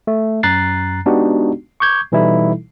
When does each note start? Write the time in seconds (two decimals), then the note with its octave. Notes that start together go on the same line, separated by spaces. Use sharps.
0.07 A3
0.43 F#2 A#5 F#6 A6 C7
1.06 G#3 B3 D4 D#4 F#4 G4
1.80 C#6 D6 G6 G#6
2.12 B2 E3 G3 D#4 E4 A4